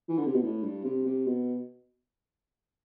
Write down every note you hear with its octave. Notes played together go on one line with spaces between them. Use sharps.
E3
D3
C3
B2
A2
G2
C3
C3
B2